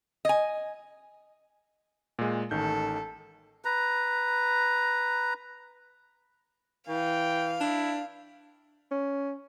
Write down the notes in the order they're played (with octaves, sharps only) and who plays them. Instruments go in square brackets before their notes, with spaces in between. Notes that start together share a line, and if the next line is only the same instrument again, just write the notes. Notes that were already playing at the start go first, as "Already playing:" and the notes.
[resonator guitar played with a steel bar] D#5 G#5
[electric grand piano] A#2 G#3
[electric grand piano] A1 D#3 G6 [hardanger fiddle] A4
[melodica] B4 A#5
[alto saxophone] E3 [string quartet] F5 [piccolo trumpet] G5
[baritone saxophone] D4 [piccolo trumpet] E4
[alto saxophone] C#4